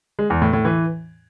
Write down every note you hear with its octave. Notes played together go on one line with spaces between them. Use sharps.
G#3
E2
A2
A2
E3